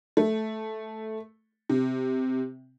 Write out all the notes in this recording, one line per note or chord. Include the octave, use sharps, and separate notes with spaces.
A3
C3